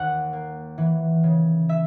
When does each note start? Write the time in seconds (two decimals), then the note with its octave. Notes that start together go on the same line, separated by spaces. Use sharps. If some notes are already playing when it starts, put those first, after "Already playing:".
Already playing: D#2 F#5
0.33 A#3
0.78 E3
1.23 C#3
1.69 E5